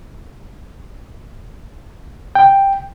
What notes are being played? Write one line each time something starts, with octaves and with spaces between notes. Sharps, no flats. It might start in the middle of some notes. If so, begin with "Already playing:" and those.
G5